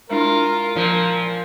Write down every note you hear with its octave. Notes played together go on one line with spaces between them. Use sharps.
G#3 D4 E4 F4 A#4
A#2 F3 A#4